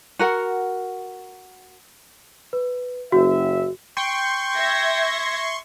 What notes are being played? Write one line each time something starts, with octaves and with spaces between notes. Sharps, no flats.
F#4 A#4 F#5
B4
F#1 F#4 E5
G5 C6 C#6
E5 G#6 A#6